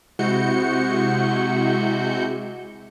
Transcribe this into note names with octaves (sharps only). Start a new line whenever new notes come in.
C3 G#3 E4 F#4 G6 C#7